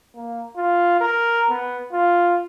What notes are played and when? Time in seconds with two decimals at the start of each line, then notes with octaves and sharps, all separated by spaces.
0.15 A#3
0.56 F4
1.01 A#4
1.50 B3
1.92 F4